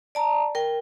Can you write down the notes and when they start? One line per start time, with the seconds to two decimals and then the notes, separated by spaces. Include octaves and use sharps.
0.15 D5 A5 A#5
0.55 A#4 G5